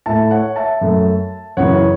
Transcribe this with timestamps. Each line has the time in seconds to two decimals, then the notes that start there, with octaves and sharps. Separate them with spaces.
0.06 A2 A3 E5 A5
0.31 C#5 F#5
0.56 E5 A5
0.81 F#2 F#3 A3
1.57 F#2 C#3 E3 C#5 F#5